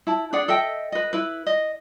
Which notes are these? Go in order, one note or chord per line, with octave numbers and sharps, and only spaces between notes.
E4 A5
D4 G#4 D5 F#5
A4 D#5 E5 G5
B4 D#5
E4 B4
D#5